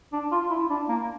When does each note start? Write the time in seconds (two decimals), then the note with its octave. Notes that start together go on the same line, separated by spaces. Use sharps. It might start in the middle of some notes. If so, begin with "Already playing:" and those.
0.13 D4
0.32 F4
0.50 E4
0.70 D4
0.89 A#3